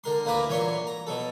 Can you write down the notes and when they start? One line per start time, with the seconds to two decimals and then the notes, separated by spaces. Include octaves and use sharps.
0.04 D3 A#4 C6
0.25 D2 A#3 E4 B4 A#5 D6
0.49 A#2 E3 F#3 C#5 C6 C#6
0.87 A#5
1.07 B2 F#3 A4